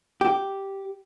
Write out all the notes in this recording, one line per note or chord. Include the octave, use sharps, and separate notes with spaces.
G4